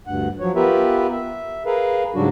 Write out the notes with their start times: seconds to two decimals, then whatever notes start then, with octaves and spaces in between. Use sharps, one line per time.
0.07 D2 G2 F#5
0.40 F3 F#3 C#5
0.55 B3 F4 G4 A#4 B4 E5
1.12 E5
1.66 G#4 A#4 B4 F5
2.15 G#2 C#3 F#3 G3 D4 F#4